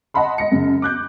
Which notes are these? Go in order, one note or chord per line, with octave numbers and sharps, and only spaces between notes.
D#5 F#5 A5 B5 C6
D#5 A#6 C#7
F#2 C#3
D6 F#6 G6